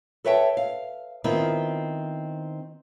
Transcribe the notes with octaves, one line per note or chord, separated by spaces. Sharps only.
A4 B4 C#5 E5 G5 A5
F5
D#3 B3 C4 E4 F4